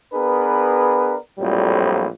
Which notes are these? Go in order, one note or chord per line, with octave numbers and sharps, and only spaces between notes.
B3 D4 G#4 A#4 B4
A#1 F2 A2 F#3 G3